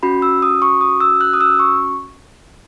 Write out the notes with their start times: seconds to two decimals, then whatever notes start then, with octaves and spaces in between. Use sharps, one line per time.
0.03 C#4 F#4 B5
0.22 E6
0.42 D#6
0.62 C#6
0.81 D#6
1.00 E6
1.21 F#6
1.33 D#6
1.41 E6
1.59 C#6